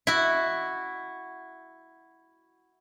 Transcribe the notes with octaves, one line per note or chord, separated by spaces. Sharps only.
E4 F#4